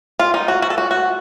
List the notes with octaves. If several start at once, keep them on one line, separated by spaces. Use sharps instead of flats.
F4
D#4
F#4
F#4
A4
F#4
F#4